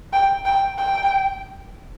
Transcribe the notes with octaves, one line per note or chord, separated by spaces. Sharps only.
G5
G5
G5